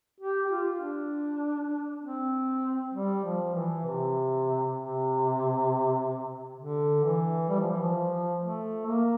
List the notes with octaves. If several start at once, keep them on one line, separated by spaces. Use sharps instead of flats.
G4
G4
F4
D4
C4
G3
F3
E3
C3
C3
D3
E3
G3
F3
E3
F3
A3
A#3